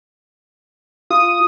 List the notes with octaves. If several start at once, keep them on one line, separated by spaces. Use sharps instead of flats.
F4 D#6